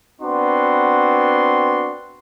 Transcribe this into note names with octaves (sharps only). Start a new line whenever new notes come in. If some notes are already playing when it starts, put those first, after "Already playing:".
B3 C4 D4 F#4 C6